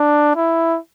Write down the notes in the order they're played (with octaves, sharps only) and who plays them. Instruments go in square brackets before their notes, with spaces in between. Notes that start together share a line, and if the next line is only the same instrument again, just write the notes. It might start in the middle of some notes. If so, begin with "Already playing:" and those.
Already playing: [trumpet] D4
E4